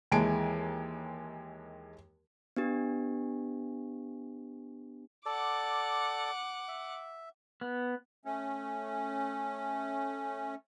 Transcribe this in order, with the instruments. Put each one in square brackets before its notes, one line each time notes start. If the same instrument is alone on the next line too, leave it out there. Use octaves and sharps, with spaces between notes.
[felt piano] D#2 E3 G#3 G#5 A5 D7
[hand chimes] B3 D4 G4
[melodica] A4 D5 [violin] F#5 D6
[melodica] E5
[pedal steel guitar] B3
[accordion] A3 C#4